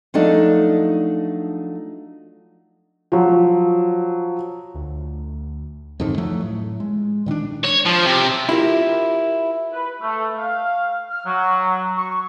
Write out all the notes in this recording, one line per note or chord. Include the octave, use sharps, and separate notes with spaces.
F3 F#3 A3 D4 D#4
F3 F#3
D2
F2 G#2 D3 D#3
F3 F#3 A3
A2
G#3
A#2 D#3 C#4 D4
C#5
F3
C3
E4 F4 G4 A#4
B4
A3
F5
F6
F#3
C#6